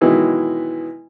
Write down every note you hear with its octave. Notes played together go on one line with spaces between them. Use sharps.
B2 D#3 E3 F#3 G#3